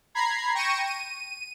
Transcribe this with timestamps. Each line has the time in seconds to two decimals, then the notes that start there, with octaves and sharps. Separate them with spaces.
0.15 A#5 B5 G#6 C7
0.55 G5 C#6 A#6 C#7 D#7 E7
0.86 D#7